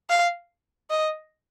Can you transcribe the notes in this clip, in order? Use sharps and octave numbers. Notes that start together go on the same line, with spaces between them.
F5
D#5